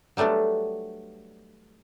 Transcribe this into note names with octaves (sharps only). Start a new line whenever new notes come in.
F#3 G3 A3 B3 D4